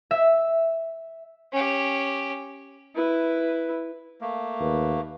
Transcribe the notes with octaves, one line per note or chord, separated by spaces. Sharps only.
E5
C#4 G4
E4 B4
A3 A#3
D#2 B4